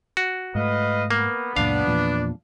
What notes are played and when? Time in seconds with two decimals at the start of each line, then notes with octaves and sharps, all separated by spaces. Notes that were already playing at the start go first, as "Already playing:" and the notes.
0.17 F#4
0.55 G#2 A3 B4 D#5 F5
1.11 A#3 B3
1.57 C#2 F#2 A#2 D4 F5
1.87 E2 A#2 F3